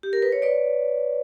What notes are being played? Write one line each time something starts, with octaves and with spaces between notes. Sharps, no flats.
G4
A#4
B4
C#5
B4 D5